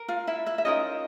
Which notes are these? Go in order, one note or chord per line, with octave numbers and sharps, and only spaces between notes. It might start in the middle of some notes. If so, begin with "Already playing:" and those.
Already playing: A#4
F4 F5
E4 E5
E4 E5
E5
C#4 D#4 F4 A#4 D#5